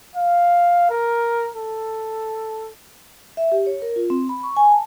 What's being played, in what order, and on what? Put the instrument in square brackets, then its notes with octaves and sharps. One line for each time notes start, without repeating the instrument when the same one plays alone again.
[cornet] F5
A#4
A4
[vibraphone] E5
G4
C#5
A#4
F4
C4
B5
C#6
G#5
A5